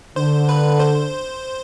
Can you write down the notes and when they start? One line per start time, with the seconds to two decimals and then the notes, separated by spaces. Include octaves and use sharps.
0.16 D3 C5
0.49 B4
0.79 C5